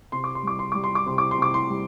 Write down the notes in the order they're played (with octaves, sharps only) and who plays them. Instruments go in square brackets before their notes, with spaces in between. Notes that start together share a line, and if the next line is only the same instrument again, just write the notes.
[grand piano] C3 C6
D6
C6
G3 D6
C6
G3 D6
C6
D6
C3 C6
D6
C6
C3 D6
C6
G3